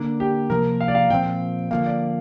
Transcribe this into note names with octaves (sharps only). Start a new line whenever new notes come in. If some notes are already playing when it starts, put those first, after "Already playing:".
Already playing: D3 A#3 D4
G4
C3 F3 A#3 A#4
F5
D5
F5
A#2 F3 C4 G5
D3 F3 A#3 F5
D5